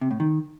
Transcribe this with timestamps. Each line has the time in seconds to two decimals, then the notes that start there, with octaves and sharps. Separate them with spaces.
0.01 C3
0.11 A2
0.20 D#3